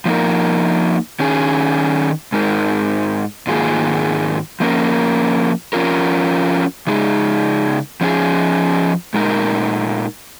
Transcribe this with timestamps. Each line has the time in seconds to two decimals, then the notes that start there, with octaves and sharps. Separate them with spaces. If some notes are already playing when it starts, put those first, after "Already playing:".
0.05 F3 A#3 D#4 A#4
1.20 D#3 C#4 G#4
2.32 G#2 G#3 D#4 A#4
3.47 G#2 D#3 A#3 F4 G#4
4.60 F3 A#3 C#4 A#4
5.73 F3 C#4 F4 A#4
6.87 C#3 G#3 D#4 G#4
8.01 F3 C#4 G#4
9.14 A#2 G#3 D#4 A#4